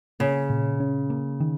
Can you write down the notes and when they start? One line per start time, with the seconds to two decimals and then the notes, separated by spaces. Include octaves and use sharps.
0.20 C#3 A#3
0.50 A#2
0.80 C#4
1.10 A#3
1.40 D#3